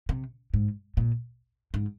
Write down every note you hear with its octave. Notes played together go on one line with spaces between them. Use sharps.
C3
G#2
A#2
G#2